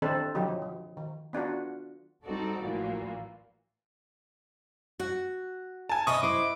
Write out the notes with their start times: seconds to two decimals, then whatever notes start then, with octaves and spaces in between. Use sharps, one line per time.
0.02 D#3 E3 C4 D4 A4 C5
0.35 D3 F3 F#3 D#4 G4
0.62 F3
0.97 D#3
1.33 B3 D4 F4 F#4
2.25 G3 C4 D#4 F#4 A4 D5
2.61 A1 A#2 E3 F3 F#4
5.00 F#4 F#5
5.89 G#5 A5
6.07 C3 B4 D#5 E5 C#6 D#6
6.23 E4 C5 D6